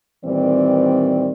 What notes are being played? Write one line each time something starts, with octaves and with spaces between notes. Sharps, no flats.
A#2 D#3 E3 G3 C4 D5